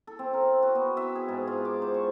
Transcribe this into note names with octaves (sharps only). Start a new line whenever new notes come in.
A4
C4
A#4
F#4
B3
E5
G#4
G#2
F4
D6
C5
C#6